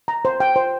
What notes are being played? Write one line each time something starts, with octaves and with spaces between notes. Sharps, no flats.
A#5
C5
G5
C5